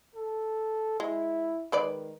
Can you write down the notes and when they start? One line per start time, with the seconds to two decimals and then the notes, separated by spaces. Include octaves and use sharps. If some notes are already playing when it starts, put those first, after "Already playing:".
0.15 A4
1.00 G#3 E4
1.72 D#3 G#3 B4 D5